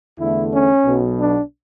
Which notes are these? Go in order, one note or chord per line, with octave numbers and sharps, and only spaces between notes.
E2 D3 A3 E4
C#4
B1 B2 F#3 B3
D4